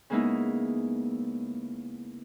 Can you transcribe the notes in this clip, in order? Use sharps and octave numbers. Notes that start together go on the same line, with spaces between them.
C#3 G#3 A#3 B3 D#4 E4